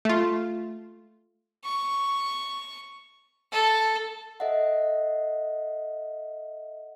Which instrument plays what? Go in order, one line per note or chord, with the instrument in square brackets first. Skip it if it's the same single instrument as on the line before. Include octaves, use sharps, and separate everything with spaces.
[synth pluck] A3 F4
[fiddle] C#6
A4
[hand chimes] A4 D#5 E5 F#5